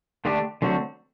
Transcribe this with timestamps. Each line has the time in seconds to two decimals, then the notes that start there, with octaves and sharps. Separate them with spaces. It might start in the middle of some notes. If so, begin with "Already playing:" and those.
0.25 D3 A3 D4 G4
0.62 D3 F#3 A3 C4 F#4